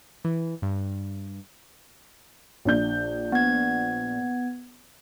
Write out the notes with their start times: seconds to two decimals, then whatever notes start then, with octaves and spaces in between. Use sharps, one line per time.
0.25 E3
0.62 G2
2.65 A#1 D4 G6
3.32 B3 G#6